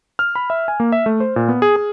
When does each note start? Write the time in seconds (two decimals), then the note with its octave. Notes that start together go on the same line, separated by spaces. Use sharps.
0.19 F6
0.35 B5
0.50 E5
0.68 G#5
0.80 A#3
0.92 E5
1.06 A3
1.20 C5
1.36 A#2
1.48 B3
1.62 G#4
1.76 G#4